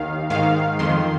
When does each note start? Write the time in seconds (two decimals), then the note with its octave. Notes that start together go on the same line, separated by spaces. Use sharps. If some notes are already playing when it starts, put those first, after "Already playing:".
Already playing: D#2 D#3 F5
0.30 G#2 D#3 F5
0.79 F2 D#3 C6